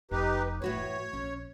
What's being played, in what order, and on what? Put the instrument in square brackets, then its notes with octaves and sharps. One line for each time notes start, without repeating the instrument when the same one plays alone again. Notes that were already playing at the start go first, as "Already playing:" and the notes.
[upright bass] F1 [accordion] D#4 G4 B4
[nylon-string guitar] A2 F#4 B4 [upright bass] E3 [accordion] C#5
[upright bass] A#1 [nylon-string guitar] C#4